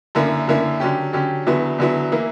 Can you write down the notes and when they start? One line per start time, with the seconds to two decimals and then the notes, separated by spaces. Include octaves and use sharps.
0.15 F#2 D3 A#3 E4
0.48 F#2 D3 A#3 E4
0.80 D3 F#3 C#4 G4
1.13 D3 F#3 C#4 G4
1.47 E2 D3 F#3 B3 E4
1.78 E2 D3 F#3 B3 E4
2.12 E3 A#3 E4